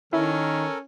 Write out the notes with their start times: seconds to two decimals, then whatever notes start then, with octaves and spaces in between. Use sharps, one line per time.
0.13 D#3 C#4 E4 A4 A#4